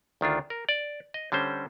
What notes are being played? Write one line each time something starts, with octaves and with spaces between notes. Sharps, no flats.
D2 D#3 D4 F4
A#4
D5
D#5
D3 G3 C#4 C5